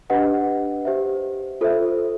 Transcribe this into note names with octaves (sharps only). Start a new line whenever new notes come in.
D4 G4 B4 D#5 F#5
G4 C5 E5
F4 A4 C5 E5